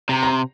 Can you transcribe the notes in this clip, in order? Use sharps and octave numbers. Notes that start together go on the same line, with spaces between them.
C3 A#5
A#5
C6